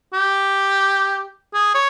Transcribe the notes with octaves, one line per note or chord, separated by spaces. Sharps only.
G4
G#4
C#5